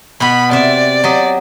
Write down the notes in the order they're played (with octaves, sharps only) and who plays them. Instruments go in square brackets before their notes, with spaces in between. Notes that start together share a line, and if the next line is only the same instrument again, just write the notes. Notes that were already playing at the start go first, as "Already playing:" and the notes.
[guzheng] B2 B3 [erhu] B5
[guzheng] C3 E5 [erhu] D5
[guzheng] F#3 G4 D#5